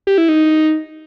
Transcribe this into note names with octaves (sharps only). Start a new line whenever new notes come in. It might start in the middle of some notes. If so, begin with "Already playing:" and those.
G4
E4
D#4